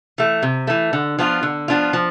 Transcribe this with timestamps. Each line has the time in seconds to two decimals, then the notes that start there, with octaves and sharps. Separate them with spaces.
0.18 E3 A3
0.43 C3
0.67 E3 A3
0.93 D3
1.19 F3 B3 D4 F4
1.43 D3
1.68 F3 B3 D4 F4
1.93 F3